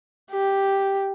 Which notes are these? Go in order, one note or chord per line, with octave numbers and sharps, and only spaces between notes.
G4